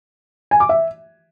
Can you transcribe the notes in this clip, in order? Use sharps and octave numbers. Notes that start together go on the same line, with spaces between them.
G#5
D6
E5